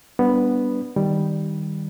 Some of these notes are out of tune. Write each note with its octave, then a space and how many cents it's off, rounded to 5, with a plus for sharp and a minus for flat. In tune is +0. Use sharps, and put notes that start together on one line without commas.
G3 +0 B3 +0 D4 -10
D#3 +0 G3 +0